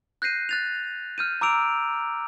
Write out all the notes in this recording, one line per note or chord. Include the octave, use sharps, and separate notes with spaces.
F#6 G6 A#6 C7 D#7
F#6 A6 F7
F6 G6 D#7
A#5 D6 E6 D7 F7